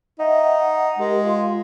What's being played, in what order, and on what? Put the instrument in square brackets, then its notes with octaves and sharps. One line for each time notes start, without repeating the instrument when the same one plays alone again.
[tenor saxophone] D#4 [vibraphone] D#5 E5 F#5
[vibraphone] F#5
[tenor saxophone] G#3 [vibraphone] G4 A#4
[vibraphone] F4 F5 C6